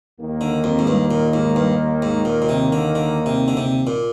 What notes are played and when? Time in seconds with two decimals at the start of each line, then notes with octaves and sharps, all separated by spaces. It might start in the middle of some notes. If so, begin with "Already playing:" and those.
0.18 D#2 D#3 A#3
0.41 D3
0.64 F2
0.79 G#2
0.87 G2
1.11 A#2
1.34 G#2
1.56 G2
2.02 G#2
2.25 A#2
2.42 A#2
2.49 C3
2.73 D3
2.95 D3
3.26 C3
3.48 D3
3.57 C3
3.87 A#2